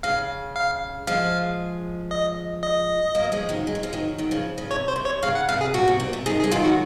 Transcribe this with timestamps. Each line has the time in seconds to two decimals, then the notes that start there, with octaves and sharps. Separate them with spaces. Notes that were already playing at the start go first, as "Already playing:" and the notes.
0.03 C#3 F5
0.56 F5
1.07 F3 G#3 F5
2.11 D#5
2.63 D#5
3.15 F#3 A#3
3.32 F3 G#3
3.49 D#3 F#3
3.67 G#3
3.75 F#3
3.83 F3 G#3
3.93 D#3 F#3
4.18 D#3 F#3
4.31 C#3 F3
4.58 C#3 F3
4.71 C3 C#5
4.88 C5
4.96 C3
5.05 C#5
5.23 C#3 F5
5.35 F#5
5.49 C3 F5
5.61 G#4
5.74 A#2 F#4
5.88 C3
6.00 A#2
6.13 C3
6.26 C3 D#3 G#4
6.39 G#4
6.44 G#3
6.51 D#3 F#3 F4
6.64 F#4